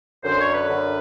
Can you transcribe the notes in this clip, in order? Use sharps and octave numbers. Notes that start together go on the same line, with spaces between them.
F#2 D3 C5
C#5
B4
F#2 D3